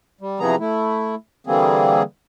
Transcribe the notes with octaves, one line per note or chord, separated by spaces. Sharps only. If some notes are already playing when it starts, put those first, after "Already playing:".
G3
C3 E3 F3 B3 G#4 A#5
A3 E4
D3 E3 G3 A#3 C4 G#4